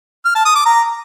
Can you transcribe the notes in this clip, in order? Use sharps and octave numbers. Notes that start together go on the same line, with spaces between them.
F6
A5
D#6
D6
A#5